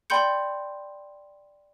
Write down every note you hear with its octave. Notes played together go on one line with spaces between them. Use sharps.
D5 G5 B5 C6 G6 C#7